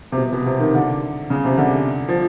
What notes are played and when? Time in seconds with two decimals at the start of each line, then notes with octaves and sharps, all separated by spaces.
0.12 C3
0.17 B2
0.32 B2
0.46 C3
0.60 D#3
0.75 D3
1.30 C#3
1.45 C3
1.58 D3
2.09 F3